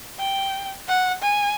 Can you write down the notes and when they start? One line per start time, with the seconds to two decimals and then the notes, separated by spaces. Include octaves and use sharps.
0.19 G5
0.88 F#5
1.22 G#5